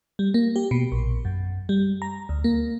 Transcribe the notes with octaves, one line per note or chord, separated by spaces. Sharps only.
G3
A#3
G4
B2
A#1
F#2
G3
A#5
D2
A#3